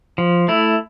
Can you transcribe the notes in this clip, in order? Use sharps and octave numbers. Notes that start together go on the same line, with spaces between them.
F3
A3 E4